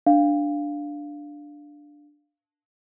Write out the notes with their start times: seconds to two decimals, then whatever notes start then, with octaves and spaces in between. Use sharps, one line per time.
0.06 D4 F5